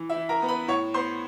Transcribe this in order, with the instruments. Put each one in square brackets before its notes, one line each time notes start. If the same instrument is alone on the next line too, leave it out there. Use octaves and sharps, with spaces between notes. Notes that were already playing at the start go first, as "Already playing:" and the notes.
Already playing: [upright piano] E3
E4 E5
E3
A#4 A#5
B3
B4 B5
A2 C#5 C#6
B3 C5 C6